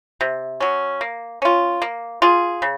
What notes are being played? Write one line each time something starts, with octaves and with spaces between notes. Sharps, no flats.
C3
F#3 C#4
A#3
C#4 F4
A#3
F4 G#4
C#3